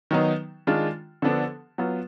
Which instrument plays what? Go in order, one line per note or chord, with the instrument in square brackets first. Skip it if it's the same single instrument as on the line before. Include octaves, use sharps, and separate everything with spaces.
[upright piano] D#3 F#3 B3 D#4
D#3 G#3 D4 F4
D3 F3 B3 D4
F#3 B3 F4